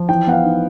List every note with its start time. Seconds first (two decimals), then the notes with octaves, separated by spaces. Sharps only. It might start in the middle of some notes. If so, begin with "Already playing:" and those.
Already playing: F3
0.09 E3 G5
0.27 B3 F#5
0.32 F5
0.45 D#4